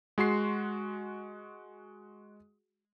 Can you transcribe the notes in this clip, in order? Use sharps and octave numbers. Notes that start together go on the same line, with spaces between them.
G#3 F#4 C6 C7